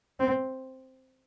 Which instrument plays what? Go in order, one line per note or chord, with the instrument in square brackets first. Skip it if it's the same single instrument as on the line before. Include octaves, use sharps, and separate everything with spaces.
[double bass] C4